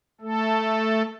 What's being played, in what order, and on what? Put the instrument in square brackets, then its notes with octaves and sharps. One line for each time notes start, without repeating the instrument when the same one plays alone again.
[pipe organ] A3 A4